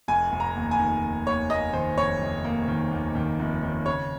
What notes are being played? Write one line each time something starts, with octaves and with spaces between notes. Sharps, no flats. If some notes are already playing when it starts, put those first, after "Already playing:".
F1 G#5
F1
A#5
D#2
G#5
D#3
D#2
D#2 C#5
A#3 D#5
D#3 C5
F1 C#5
F1
A#3
D#3
D#2
D#3
F1
D#3
C#3 C#5